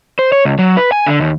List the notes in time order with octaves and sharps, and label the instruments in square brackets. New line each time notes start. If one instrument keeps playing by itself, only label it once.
[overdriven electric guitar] C5
C#5
C#2
F#3
B4
G#5
D3
D#2